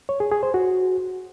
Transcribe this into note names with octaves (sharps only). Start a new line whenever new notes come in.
C#5
G#4
G#4
C5
F#4